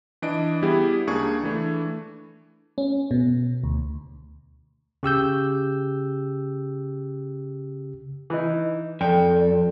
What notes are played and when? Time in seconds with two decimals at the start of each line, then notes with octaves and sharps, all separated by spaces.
0.22 E3 D4 D#5 D7
0.62 G3 B3 E4 G4 G#4
1.07 C#2 A#3 D4 G#4 C#6 G#6
1.43 E3 A3 D4
2.78 C#4
3.11 B2
3.64 D2
5.03 C#3 G4 E6 G6
8.30 E3 D#4
9.01 F2 A4 D5 G5